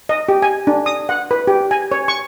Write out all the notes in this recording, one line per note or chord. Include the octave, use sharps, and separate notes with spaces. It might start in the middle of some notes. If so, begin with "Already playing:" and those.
D#5
G4
G#5
D4
D#6
F#5
B4
G4
G#5
C#5
C#6